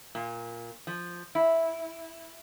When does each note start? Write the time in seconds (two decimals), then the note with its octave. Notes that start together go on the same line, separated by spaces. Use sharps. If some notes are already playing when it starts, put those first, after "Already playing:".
0.15 A#2
0.87 F3
1.35 E4